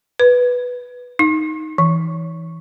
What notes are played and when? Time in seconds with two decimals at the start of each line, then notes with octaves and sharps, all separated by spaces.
0.20 B4
1.19 D#4
1.78 E3